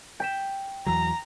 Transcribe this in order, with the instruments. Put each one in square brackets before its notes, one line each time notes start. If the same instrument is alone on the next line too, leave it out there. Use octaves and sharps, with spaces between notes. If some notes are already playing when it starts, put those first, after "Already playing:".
[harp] G5 B6 E7
[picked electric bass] E2 E3 F#3 [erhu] A#5